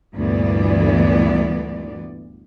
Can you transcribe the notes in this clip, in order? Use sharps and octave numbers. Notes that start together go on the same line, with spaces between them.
D2 G2 A#2 E3 B3 D5